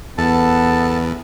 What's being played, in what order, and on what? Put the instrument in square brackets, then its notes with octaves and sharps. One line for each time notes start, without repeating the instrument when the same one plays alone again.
[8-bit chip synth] E2 [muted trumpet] B3 [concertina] A4 A5